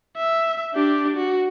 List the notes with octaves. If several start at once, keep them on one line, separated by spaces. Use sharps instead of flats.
E5
D4 G4
F#4